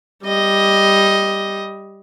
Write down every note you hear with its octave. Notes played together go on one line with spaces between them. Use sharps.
G3 D#5